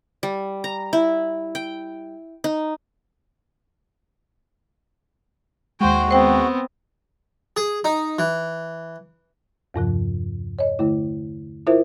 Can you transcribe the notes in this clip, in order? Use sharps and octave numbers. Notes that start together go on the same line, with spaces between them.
G3
A#5
E4
G5
D#4
D#2 G#3 F#4 C5 G5
B3 C4 C5 G5
G#4
D#4
E3
E2 G2 C3 F3
C#5 D#5
D3 A3 E4
E4 F4 A#4 C5 E5